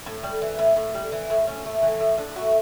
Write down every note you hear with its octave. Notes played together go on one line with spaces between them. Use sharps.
A2
G3
E3
A2
A2
G3
E3
A2
A2 C#4
A3
E3
A2
A2 D4
A3 F#4